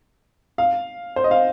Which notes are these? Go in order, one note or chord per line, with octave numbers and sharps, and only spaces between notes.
F5
C5
D#5
F5